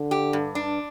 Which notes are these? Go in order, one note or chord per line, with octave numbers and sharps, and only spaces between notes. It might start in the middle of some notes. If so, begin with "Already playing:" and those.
Already playing: D3
G4
G2
D4